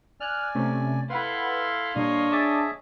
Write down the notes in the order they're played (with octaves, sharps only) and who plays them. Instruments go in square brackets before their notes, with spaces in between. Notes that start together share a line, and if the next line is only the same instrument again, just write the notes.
[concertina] D5 G#5 [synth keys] F6 F#6
[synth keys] C3 A3 C#4
[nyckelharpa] E4 A4 [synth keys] B4 F#5 B5 [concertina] F5 C6
[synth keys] A#2 G3 [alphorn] D4 [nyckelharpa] C#5 D#5
[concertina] G#4 E5 [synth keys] A5 D6 A6